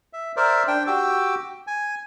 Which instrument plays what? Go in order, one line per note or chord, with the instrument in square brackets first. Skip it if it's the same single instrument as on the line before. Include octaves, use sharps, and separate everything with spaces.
[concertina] E5
A#4 C5 D5 E5
D4 G5
F#4 G4 G5 D6 E6
G#5